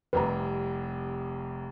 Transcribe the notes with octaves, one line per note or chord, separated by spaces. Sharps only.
F1 C2 B4 A#5